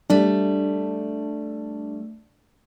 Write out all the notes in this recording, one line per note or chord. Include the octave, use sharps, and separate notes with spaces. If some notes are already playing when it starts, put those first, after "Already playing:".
G3 A3 D4